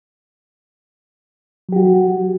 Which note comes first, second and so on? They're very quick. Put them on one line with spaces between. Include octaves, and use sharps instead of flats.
F#3 G4 F#4